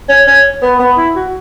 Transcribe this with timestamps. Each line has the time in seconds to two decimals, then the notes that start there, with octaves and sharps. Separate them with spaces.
0.09 C#4
0.27 C#4
0.62 B3
0.79 B3
0.97 E4
1.16 F#4